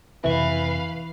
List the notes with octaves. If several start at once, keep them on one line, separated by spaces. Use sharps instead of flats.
F2 C3 E3 C4 B4 F5 C#6